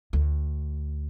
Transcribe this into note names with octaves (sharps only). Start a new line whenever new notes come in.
D2